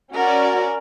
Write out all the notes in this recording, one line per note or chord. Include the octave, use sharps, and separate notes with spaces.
C#4 F#4 A#4 D5